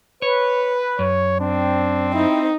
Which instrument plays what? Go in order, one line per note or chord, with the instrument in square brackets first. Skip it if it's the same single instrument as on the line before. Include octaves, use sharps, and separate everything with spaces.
[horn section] B4 [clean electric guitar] C#5
[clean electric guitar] F#2 [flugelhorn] C#5
[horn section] C4 [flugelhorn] D4
[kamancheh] D#4 [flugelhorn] E4